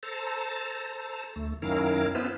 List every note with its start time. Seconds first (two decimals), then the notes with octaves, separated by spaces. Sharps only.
0.03 A4 C5 A5 A#5
1.36 D2 A3
1.62 F#2 D#3 C#4 E4 A#4 F5
2.15 B3 C#4 E4 F4 B4 C5